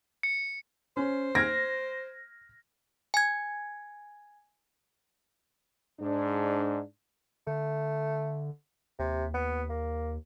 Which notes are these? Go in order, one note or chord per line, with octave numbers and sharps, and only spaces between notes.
C#7
C#4 C5
F6 G#6 A#6 D7
G#5 G#6
G#2 D4
D3 A3
D#2 C3
B3
A#3